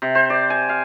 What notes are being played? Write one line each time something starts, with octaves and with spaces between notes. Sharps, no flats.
C3
C5
D5
G#5
F5